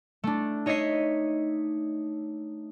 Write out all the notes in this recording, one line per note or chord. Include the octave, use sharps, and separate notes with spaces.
A3 D4
D#4 C#5 D#5 E5 C7